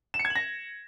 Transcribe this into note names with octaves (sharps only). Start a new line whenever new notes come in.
E7
C#7
G#6
F#7
A#6